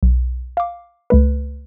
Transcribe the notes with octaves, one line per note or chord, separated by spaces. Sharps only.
B1
F5 D6
C#2 A3 B4